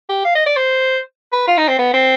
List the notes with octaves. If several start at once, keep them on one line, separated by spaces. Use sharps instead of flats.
G4
F5
D#5
D5
C5
B4
F4
D#4
C4
B3
C4